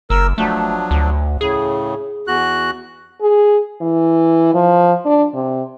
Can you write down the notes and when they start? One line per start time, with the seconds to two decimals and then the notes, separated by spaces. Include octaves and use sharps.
0.10 F#1 A#4 E6
0.38 F3 F#3 A3 D4
0.91 D2
1.41 A2 C#3 G#4
2.27 E2 F#4 F#6
3.21 G#4
3.81 E3
4.54 F3
5.05 D4
5.34 C3